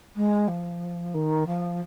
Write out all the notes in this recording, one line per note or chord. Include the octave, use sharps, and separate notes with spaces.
G#3
F3
D#3
F3